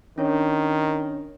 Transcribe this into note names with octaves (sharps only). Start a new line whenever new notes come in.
D#3 C#4 D4 C#5